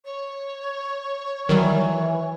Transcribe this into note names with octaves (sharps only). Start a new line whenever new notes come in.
C#5
D#3 E3 F#3 G3